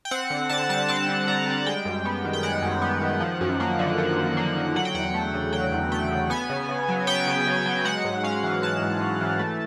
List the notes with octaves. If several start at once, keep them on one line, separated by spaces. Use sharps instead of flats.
G5
C4 F#5
D3
D3 A5
G3 A5
C4 A5
D3
D3 A#5
G3
G#3 G5
F#2
B3
D#3
G5
G#3 F#5
F#2
B3
D#3
F3
F#2
A#3
D3
F3
F#2
A#3
D3
F#3 F#5
G5
E2 F#5
A3
C#3
F#3 G5
E2
A3 G5
C#3
B3 G#5
C#3
C#3
F#3
B3 G5
C#3
C#3
F#3
G#3 F#5
G#2
C#4 F5
E3
G#3 A5
G#2
C#4
E3
A3